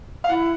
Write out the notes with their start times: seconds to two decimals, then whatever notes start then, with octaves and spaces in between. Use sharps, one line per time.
0.24 F5
0.29 E4 F#5